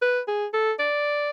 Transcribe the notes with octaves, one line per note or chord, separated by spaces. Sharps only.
B4
G#4
A4
D5